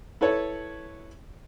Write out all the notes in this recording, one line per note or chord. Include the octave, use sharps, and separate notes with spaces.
E4 A4 B4 C#5